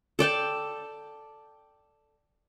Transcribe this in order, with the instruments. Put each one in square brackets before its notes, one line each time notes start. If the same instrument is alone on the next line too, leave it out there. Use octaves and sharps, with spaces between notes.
[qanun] A4 D5 G5 A5